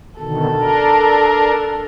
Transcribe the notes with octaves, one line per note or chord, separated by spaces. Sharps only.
B2 D3 D#3 A4
D4 A#4